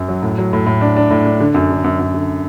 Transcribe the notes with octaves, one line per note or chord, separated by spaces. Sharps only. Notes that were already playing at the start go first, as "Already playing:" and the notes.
Already playing: F#2
F#3
A2
F#3
A2
A2
D4
D4
A2
D4
D3
F#2
D3
F#2
F#2
D3